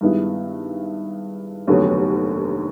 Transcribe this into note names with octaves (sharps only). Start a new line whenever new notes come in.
G2 D#3 G#3 B3 E4
F1 D#2 D3 F#3 B3